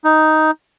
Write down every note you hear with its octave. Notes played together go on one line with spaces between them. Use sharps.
D#4